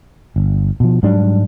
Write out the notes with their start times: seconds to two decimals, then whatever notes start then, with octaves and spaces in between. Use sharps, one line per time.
0.36 G1
0.80 B2 F3
1.03 G#2 F#3 G3 D4